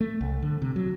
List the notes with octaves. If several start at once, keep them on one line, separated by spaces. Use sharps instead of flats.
A3
C2
D3
C3
F#3